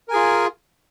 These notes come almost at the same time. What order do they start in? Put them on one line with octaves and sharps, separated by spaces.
A#4 G#5 G#4 F4